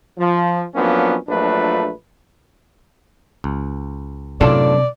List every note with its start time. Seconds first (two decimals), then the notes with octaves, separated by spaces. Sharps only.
0.18 F3
0.75 F3 F#3 A#3 B3 C#4 D4
1.28 A#1 A#2 F#3 A3 D4 B4
3.44 C#2
4.41 B1 F#2 A2 C3 D4 F4 A4 D5